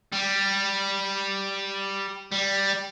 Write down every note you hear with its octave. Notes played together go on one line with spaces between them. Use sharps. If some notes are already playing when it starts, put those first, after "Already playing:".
G3
G3